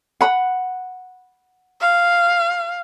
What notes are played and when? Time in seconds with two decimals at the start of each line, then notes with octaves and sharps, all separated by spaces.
0.21 F#5 B5
1.81 F5